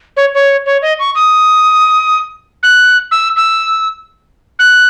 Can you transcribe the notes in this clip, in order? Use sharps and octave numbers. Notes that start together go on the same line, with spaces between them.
C#5
C#5
C#5
D#5
C#6
D#6
F#6
E6
E6
F#6